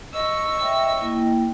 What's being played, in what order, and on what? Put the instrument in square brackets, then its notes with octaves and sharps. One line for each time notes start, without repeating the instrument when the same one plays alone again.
[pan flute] D#5 [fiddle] C#6 E6
[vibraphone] C#5 E5 G5
A#3 E4 G5